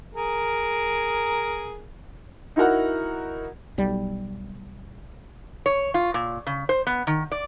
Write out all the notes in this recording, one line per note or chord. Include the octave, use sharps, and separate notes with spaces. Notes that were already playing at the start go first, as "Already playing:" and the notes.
G#4 A#4
D#4 E4 F#4 A#4 F#5
B1 G3
C#5
F4
A#2
C#3
C5
B3
D#3
D5